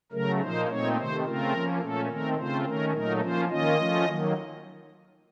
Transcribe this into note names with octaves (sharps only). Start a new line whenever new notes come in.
C#3 F#3 A3 A#4
A#2 F3 A#3 D#4 C5
A#2 A3 C4 D#4 C#5
C3 D#3 A3 C5
C#3 A3 C4 F4 A#4
F3 A#3 C#4
A#2 A3 C#4 A4
D#3 A3 C4 A#4
C#3 A3 C4 F4 C5
D#3 A3 C#4 A#4
A#2 F#3 A3 D#4 A#4
F3 A#3 C#4 F4 C5
D#3 A#3 C#4 F4 D#5
F3 A3 C#4 F4
D#3 F#3 A#3